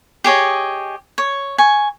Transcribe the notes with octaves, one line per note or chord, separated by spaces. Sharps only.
G4 G#4 C#5 D#5
C#5
G#5 C#6